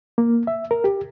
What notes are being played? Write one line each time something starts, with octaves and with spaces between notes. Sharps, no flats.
A#3
E5
A#4
G4